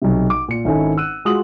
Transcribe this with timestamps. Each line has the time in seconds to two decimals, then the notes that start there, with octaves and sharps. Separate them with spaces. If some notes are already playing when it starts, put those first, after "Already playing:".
0.02 B1 C3
0.30 D6
0.48 A#2 C#7
0.65 G#1 C#4 D#4 E4 A4 G#5
0.97 E6 F#6 D#7
1.25 G#3 F4 F#4 D#6 F#7